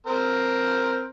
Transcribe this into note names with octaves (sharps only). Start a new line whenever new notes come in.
C4 A#4 C5